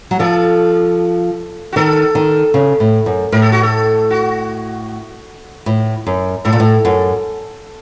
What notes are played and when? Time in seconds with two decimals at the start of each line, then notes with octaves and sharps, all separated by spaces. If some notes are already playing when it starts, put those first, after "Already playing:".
0.11 F#3
0.19 F3 A4
1.73 F#4
1.76 D#3 A4
2.15 D#3
2.54 C#3
2.80 A2
3.06 F#2
3.32 A2 A#4
3.42 A4
3.52 F#4
3.63 A4
4.10 F#4
5.66 A2
6.07 F#2
6.45 A2 A4
6.53 A#2
6.60 A2
6.85 F#2